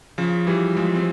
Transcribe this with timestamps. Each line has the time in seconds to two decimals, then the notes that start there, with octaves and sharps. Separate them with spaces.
0.18 C#3 F3
0.47 E3 G3
0.76 F3 G#3
0.95 C4